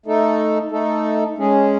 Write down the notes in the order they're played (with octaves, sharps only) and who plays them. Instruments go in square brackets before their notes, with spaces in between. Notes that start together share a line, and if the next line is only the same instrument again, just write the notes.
[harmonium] A3 D#4 A4
A3 D#4 A4
G#3 C#4 G#4